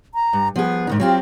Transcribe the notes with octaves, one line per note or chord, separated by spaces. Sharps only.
A#5
G2
F3 B3 G#4
G#2 D#3 D#4
F#3 C4 F4 G4